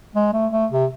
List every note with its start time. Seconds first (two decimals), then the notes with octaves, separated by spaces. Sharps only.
0.16 G#3
0.34 A3
0.53 A3
0.72 C3